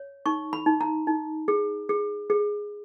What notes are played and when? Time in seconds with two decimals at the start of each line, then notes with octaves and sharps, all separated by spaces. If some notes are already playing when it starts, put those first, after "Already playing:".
Already playing: C#5
0.26 D#4 C#6
0.53 B5
0.66 D#4
0.81 A#5
1.07 D#4
1.48 G#4
1.89 G#4
2.30 G#4